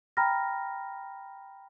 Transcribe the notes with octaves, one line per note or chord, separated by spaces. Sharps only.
G5 A#5 B5 F6 A#6